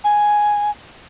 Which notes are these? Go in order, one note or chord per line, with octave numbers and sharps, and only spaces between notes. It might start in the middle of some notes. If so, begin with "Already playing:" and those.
G#5